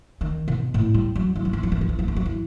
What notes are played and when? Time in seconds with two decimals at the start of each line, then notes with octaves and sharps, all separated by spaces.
0.21 D#3
0.48 B2
0.74 A2
0.94 G3
1.15 F#3
1.35 E3
1.45 F#3
1.53 E3
1.63 F#3
1.72 E3
1.81 F#3
1.89 E3
1.99 F#3
2.08 E3
2.16 F#3
2.26 E3